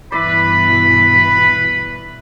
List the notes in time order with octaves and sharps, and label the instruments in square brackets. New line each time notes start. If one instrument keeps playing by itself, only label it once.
[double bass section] G2 B2 E3 [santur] E4 D5 [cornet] B4 [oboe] B5